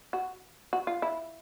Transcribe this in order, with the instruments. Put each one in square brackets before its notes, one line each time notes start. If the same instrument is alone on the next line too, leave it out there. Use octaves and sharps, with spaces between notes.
[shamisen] F#4
F#4
F4
E4